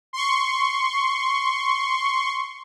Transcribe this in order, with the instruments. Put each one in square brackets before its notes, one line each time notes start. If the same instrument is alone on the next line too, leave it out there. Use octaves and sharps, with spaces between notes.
[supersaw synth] C6 C#6